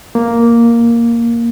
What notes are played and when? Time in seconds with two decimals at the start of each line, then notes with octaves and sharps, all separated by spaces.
0.15 A#3